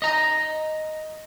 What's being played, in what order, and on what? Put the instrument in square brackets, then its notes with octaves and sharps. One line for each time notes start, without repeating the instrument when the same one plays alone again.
[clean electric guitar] D#5 A#5